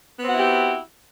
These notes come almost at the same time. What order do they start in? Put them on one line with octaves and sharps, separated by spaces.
B3 C4 F#4 E4 G4